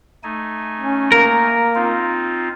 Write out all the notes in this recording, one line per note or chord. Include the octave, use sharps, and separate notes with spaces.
A3 D#4 G#5
C#4
A#3 A#4
C4 D#4 F4